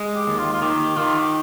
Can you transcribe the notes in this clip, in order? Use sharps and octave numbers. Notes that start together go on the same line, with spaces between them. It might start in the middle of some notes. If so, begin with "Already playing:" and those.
Already playing: G#3
G4
D#2
F4
F4
D#3 G4
D#3 F4
G4